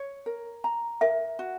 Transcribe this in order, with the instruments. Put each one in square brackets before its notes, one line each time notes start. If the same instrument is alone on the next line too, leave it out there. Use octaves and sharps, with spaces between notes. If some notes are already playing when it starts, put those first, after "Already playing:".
Already playing: [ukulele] C#5
A#4
A#5
[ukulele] A#4 [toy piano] E5
[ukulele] F#4